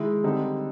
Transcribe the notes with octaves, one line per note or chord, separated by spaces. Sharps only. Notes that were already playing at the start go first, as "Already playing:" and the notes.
Already playing: D#3 G#3 E4
D3 G3 C4 D#4